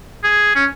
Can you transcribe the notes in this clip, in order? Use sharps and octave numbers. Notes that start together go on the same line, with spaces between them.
G#4
C#4